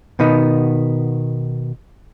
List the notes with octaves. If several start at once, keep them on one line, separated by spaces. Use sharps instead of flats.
B2 D#3 B3 D#4